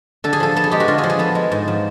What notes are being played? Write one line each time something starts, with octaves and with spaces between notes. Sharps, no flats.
D3 A4
G#4
F3 A4
B3 A4
G#4
G#3 G4
F#4
D3 F4
G#4
F3
G#4
B3 A4
G#3
G#2
F3